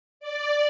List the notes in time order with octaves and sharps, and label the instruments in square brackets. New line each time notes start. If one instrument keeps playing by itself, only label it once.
[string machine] D5